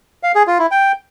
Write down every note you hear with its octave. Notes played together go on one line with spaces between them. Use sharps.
F5
G#4
F4
E4
G5